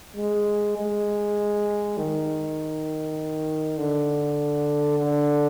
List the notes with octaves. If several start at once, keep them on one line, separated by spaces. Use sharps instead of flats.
G#3
G#3
D#3
D3
D3